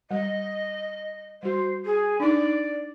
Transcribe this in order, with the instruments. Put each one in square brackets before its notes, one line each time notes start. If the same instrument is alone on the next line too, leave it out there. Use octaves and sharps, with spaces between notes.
[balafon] G3 [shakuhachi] D#5
[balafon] G3 F#4 [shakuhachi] C5
[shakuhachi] G#4
[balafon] D4 D#4 [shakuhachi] D5